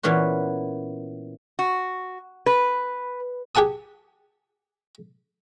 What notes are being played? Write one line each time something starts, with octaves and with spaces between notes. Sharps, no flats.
A#2 E3 B3 C#4 F#4
F#4
B4
G4 G#4 F#5 A5 D#6